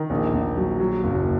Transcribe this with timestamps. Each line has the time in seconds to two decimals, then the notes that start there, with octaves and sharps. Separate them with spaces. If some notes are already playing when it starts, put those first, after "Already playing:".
Already playing: D#3
0.10 A#1
0.34 A#1
0.57 F#3
0.80 F#3
1.04 F#1